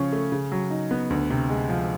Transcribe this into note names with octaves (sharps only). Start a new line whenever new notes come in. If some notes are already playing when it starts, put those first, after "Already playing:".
Already playing: C#3 F3 C#4
A3
C#3
F#3
D#4
B3
D2
C3
G#3
F3